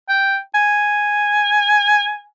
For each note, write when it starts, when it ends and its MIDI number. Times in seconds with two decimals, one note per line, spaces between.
0.09 0.38 79
0.55 2.25 80